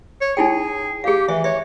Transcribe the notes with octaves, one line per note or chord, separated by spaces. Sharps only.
C#5
D#4 E4 G#4 G5
G4 G#4 F5
E3 E5
C#5 E5